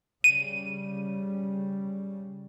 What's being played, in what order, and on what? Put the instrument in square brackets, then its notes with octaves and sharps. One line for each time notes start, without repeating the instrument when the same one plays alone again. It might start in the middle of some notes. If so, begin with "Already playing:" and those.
[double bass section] C#3 G3 [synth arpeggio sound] D#7